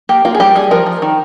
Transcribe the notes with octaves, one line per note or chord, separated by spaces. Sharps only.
A#3 G4
A#3 F4
G#4
G3 G4
G3 G#4
F3 A#4
F3
D#3